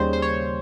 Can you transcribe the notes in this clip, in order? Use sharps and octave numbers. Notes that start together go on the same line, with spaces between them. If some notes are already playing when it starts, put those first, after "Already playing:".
Already playing: D#2 C#3 G3 C5
C5
C#5